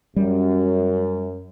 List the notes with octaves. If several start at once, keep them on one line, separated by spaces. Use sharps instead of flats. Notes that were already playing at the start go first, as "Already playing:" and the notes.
F#2 G3